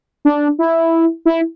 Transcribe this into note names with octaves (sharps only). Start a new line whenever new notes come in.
D4
E4
E4